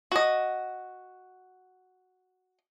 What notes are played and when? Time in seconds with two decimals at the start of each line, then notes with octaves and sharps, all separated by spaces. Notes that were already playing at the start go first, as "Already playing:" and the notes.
0.12 F#4 D#5